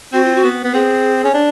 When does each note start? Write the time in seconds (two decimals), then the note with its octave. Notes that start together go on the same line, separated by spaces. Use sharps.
0.12 C4 F#4
0.24 F4
0.35 F#4
0.44 B3
0.64 B3
0.73 C4 G#4
1.24 C#4
1.34 D4